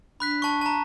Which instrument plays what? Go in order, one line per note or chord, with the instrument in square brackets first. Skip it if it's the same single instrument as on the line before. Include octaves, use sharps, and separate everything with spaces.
[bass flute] D4 [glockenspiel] B5 F#6 B6
[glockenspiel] A5 C#6
A5 A#5